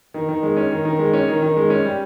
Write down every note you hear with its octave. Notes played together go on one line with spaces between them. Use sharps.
D#3
D#3
G#3
C#4
D#3
D#3
G#3
C#4
D#3
D#3
G#3
C#4
G3